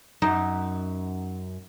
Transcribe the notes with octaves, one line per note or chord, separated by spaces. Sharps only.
F#2 D#4